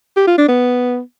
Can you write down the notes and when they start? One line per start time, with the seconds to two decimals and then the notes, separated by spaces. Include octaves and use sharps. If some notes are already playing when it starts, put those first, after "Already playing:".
0.17 G4
0.27 F4
0.38 D4
0.48 B3